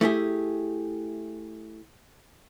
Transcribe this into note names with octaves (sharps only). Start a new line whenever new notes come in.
A3 E4 G4 G#4